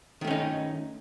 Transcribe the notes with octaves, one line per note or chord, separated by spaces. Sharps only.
D#3 A3 C#4 D#4